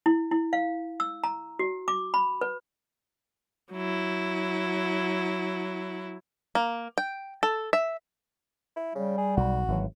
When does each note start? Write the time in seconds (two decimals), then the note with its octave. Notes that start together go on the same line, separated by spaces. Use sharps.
0.06 E4
0.31 E4
0.53 F5
1.00 E6
1.24 A#5
1.59 F#4
1.88 D6
2.14 B5
2.41 B4
3.73 F#3 E4
6.55 A#3
6.98 G5
7.43 A4
7.73 E5
8.77 E4
8.95 C#3 G3
9.18 G#4
9.37 B1 F#4
9.68 G#1 E3 F#3